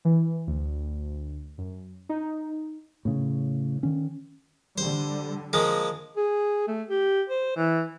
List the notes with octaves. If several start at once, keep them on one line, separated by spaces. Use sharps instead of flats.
E3
D2
F#2
D#4
A2 C#3
D#3 C#4
D3 G3 C5
F3 G#3 A#3
G#4
A3
G4
C5
E3